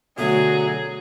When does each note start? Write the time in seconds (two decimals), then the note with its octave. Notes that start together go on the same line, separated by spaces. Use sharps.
0.18 B2 D3 F#3 A3 G#4